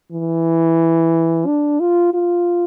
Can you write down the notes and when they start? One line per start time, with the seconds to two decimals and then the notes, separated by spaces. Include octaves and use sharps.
0.12 E3
1.46 D4
1.80 F4
2.14 F4